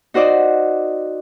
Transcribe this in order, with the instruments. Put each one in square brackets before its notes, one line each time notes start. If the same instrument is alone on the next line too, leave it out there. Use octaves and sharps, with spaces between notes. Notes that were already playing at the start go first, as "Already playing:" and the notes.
[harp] D#4 F#4 C5 D5 D#5